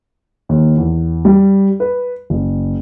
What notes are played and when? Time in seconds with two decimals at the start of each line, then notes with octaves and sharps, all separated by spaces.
0.49 D#2
0.77 E2
1.25 G3
1.80 B4
2.30 F#1